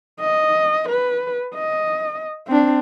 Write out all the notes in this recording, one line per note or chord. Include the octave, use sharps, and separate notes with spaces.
D#5
B4
D#5
C4 D4